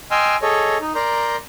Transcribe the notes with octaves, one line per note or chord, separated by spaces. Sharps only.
D#5 G5 G#5 C6 E6 F6
G#4 A4 C#5 D#5
D#4
A#4 D5 A#5 C6 G6